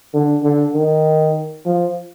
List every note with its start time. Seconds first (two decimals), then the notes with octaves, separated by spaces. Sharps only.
0.14 D3
0.43 D3
0.74 D#3
1.66 F3